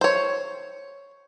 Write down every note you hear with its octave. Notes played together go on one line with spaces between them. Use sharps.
C5 C#5